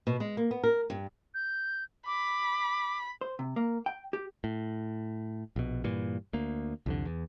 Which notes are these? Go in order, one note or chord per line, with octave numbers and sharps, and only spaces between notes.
B2
G#3
A#3
B3
A#4
G2
G6
B5 D6
C5
C3
A#3
G5
G4
A2
A#1 B2
G2 A#2 E3
D2 A#3
C2 F2 D3
E2